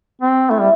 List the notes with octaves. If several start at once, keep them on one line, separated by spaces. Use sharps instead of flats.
C4
A3 E4
G3